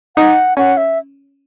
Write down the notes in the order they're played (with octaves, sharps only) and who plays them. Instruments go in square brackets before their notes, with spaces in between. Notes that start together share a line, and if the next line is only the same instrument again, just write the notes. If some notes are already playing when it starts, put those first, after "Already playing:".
[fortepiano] D#4 [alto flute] F#5
[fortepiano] C#4 [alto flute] F#5
[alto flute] E5